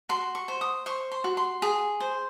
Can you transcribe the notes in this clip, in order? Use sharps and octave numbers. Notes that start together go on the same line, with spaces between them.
F#4 C6
C#6
C5
D#6
C5 C#6
C6
F#4
C6
G#4
C5